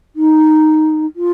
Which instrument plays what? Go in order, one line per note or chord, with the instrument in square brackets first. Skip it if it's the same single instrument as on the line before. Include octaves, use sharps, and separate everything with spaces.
[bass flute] D#4
F4